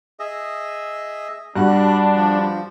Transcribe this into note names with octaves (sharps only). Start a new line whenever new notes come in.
G#4 D#5 E5
G2 G3 D4 F#4 F#6
F3